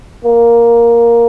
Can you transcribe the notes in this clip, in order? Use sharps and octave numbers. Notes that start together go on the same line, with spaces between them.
A#3